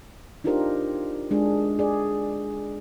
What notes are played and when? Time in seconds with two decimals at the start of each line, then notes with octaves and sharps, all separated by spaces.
0.44 D4 D#4 F4 G4 A#4 C5
1.31 G#3 D4 G#4
1.79 G#4 D5